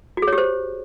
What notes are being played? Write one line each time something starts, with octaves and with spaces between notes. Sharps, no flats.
F#4
G#4
C#5
G4
C5